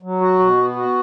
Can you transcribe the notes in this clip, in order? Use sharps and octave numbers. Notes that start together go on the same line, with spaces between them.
F#3
F#4
B2
B3
F#4